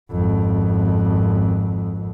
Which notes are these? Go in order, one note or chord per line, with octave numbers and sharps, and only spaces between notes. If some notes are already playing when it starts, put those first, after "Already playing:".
G#1 F2